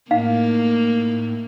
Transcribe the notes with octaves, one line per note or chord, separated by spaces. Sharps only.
A2 A#3 D#4 F5